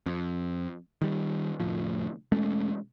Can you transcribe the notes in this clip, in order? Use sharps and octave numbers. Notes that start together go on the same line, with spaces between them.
F2
D#3 G3
F1 D2 A2 F3
E1 G#3 A3 C#4